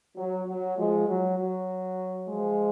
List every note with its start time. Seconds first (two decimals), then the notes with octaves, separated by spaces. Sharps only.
0.17 F#3
0.47 F#3
0.77 F3 G#3
1.08 F#3
1.38 F#3
2.28 F3 G#3